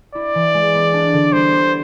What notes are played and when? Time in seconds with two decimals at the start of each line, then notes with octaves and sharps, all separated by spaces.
0.15 E4 D5
0.35 E3
0.54 G#3
0.75 B3
0.93 D4
1.13 D3
1.32 G3 C5
1.52 B3